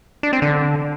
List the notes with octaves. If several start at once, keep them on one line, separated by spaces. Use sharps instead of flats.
D4
C4
D3